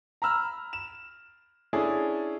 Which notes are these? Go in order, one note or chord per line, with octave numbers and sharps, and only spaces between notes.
A#5 B5 E6 F6
E7
C#4 D4 E4 G#4 A4